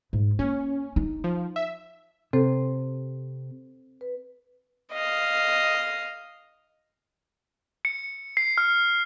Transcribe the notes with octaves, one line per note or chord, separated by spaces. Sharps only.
G#2
A#3 C#4
D#4
F3
E5
C3 C4 A4 C5
B4
D#5 F5
C#7
C7
F6